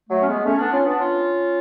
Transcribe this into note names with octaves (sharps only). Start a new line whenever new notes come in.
F#3 A3
C#4
G#3 B3
A3 C#4
B3 D4
C#4 F4
B3 D4
C#4 F4